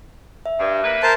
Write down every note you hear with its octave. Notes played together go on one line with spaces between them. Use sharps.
E5
G2
A#3 B4
A#4 C5 A5